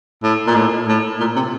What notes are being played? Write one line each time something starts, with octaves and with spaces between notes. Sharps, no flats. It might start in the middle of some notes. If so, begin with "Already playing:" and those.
A2
A#2
A2
A2
A#2
C3